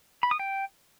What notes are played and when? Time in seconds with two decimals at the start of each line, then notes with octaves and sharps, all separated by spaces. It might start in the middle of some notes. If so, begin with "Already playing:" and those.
0.23 B5
0.31 D#6
0.39 G5